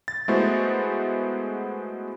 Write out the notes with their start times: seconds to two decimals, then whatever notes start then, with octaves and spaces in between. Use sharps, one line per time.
0.08 A6
0.28 G#3 A3 B3 E4 F#4 C5